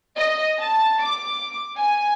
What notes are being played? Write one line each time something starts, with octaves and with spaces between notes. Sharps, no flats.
D#5
A5
D6
G#5